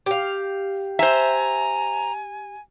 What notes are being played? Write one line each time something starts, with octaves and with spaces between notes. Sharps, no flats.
G4 F5
C5 E5 G#5 A#5